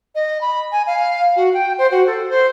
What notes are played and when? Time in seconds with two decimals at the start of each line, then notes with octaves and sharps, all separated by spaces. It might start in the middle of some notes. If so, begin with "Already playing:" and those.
0.15 D#5
0.41 B5
0.72 G#5
0.87 F5
1.36 F#4
1.54 G5
1.78 C5
1.91 F#4
2.06 A4
2.29 C5